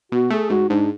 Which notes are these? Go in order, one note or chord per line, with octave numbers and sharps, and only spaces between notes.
B2 F#4
A3 G#4
G#2 F#4
G#2 D4